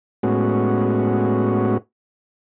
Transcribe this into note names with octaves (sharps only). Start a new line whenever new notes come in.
A2 G#3 B3 C#4 F#4